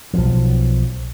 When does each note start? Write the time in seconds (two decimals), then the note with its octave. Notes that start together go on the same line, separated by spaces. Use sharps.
0.14 B1 F3